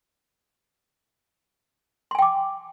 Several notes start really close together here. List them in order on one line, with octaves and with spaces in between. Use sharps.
C6 G#5 G5 D6